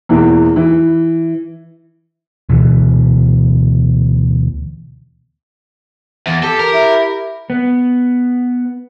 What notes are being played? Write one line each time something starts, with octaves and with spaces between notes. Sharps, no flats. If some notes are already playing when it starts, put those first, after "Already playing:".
E2 B2 E3 A#3
E3
D2 B2 E3
E2
G4 A4
A#4
E4
B3